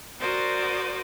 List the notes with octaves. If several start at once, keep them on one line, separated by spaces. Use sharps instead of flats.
F#4 A#4 C5 D5 D#6